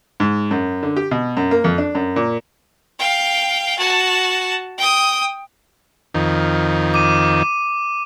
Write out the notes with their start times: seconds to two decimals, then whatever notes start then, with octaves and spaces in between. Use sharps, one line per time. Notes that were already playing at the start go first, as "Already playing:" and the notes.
0.20 G#2
0.51 F#2
0.83 D3
0.96 G4
1.11 B2
1.37 F#2
1.51 A#3
1.64 F2
1.78 D4
1.95 F#2
2.16 A#2
2.99 F5 G5
3.78 F#4 A5
4.78 G5 D#6
6.14 F2 D#3
6.94 D6 D#7